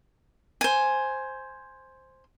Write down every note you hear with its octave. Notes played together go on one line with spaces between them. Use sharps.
C5 G#5